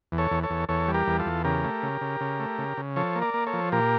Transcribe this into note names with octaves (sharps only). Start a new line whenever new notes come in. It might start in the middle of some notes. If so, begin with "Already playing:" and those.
E2
A4 C#5
E2
A4 C#5
E2
E2 A4 C#5
G3
G4 A#4
E2
F4 A4
E2
C#3 G4 A#4
A3
C#3
C#3
C#3
A3
C#3
C#3
F3 A4 C#5
A#3
A#4 D5
A#3
A4 C#5
F3
A#2 G4 A#4